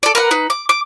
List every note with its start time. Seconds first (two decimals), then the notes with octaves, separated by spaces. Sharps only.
0.03 A4 D5
0.15 A#4 B4 F#5
0.31 D#4 B4
0.50 D6
0.69 D6